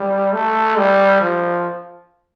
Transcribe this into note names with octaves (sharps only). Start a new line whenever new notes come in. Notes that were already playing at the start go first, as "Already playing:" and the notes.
Already playing: G3
A3
G3
F3